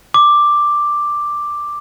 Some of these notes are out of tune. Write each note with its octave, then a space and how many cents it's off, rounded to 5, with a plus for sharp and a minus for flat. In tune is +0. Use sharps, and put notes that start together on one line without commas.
D6 +5